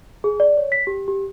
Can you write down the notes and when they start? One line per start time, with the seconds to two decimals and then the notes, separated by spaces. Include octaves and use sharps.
0.24 G#4
0.40 D5
0.57 C#5
0.72 B6
0.87 G4
1.08 G4